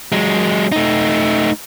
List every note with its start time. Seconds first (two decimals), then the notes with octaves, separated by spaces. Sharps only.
0.12 F#3 G#3
0.72 A3 D#4